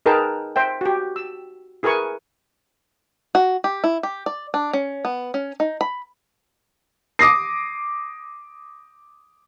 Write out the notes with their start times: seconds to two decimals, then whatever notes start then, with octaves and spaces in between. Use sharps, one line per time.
0.06 D#4 G#4 A#4 B4 G5 A5
0.56 C5 E5 G5
0.81 F#4 G4
1.16 E6
1.83 E4 G#4 A#4 B4 G#5 C#6
3.35 F#4
3.64 G4
3.84 E4
4.03 G4
4.26 D5
4.54 D4
4.73 C#4
5.05 B3
5.34 C#4
5.60 D#4
5.81 B5
7.19 D6 D#6 A#6 C7